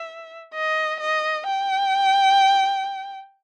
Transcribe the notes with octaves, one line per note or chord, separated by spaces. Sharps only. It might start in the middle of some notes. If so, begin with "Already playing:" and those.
Already playing: E5
D#5
D#5
G5